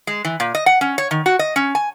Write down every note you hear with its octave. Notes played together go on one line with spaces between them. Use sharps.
G#3
E3
A#2
D#5
F#5
C#4
C#5
D#3
F#4
D#5
C#4
G#5